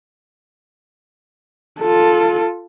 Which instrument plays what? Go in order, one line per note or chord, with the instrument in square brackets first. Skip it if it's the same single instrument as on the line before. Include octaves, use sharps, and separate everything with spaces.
[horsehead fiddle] F4 A4